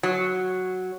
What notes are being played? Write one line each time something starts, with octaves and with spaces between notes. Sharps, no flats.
F#3